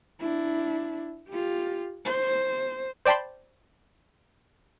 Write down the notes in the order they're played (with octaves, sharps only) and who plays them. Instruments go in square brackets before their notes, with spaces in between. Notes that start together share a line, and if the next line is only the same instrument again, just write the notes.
[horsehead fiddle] D4 E4
F4 G4
C5
[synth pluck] C5 D5 G5 A5 B5 C6